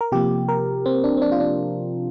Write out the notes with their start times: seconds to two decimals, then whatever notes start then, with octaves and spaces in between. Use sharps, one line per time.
0.01 A#4
0.12 C3 F3 A#3 G4
0.48 A#4
0.86 C4
1.04 D4
1.17 C4
1.22 D4
1.32 F4
1.40 D4